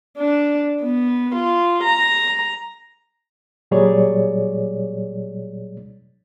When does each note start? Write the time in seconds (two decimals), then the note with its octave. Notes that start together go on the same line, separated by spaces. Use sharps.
0.18 D4
0.82 B3
1.35 F4
1.84 A#5
3.71 A#2 F#3 G3 G#4 C#5 D5